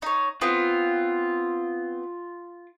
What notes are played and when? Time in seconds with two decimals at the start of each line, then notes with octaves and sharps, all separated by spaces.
0.02 D#4 C#5
0.41 B3 C4 F4